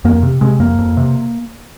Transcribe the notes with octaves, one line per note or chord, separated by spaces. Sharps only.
F2 A#3
C3
C3 G#3
F2 A#3
F2
C3